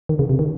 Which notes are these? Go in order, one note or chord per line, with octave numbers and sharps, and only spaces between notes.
D#3
C#3
C3
D#3